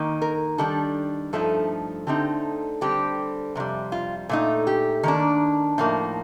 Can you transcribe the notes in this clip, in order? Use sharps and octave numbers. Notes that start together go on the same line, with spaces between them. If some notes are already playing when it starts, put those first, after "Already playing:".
Already playing: D#3 A#3 D#4
A#4
D#3 G3 D4 A4
G2 F3 A3 D#4 A4
D3 A3 C4 D#4 G4
D3 G3 C4 G4
F2 C3 G3
F4
A#2 A3 D#4
G4
D#3 A#3 D4
A2 F3 A#3 D#4